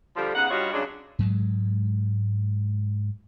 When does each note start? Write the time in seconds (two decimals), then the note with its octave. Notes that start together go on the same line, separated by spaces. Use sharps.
0.16 D3 F3 G3
0.35 C#3 B3 D#4 F#5
0.51 G2 G3 F4 F#4 C#5 D#5
0.73 C#3 F#3 G#3 D4
1.19 G#2 F#3 G#3